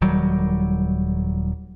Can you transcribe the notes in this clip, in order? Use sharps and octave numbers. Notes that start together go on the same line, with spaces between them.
D#1 D#3 F#3 G3